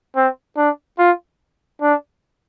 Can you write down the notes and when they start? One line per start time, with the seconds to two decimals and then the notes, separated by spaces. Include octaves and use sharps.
0.15 C4
0.57 D4
0.98 F4
1.81 D4